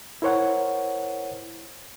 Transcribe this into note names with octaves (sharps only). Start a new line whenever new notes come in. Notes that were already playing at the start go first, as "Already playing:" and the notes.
E4 A#4 C5 C#5 F#5